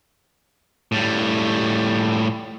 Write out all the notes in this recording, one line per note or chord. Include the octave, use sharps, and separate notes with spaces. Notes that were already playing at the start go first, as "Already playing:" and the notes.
A2 G3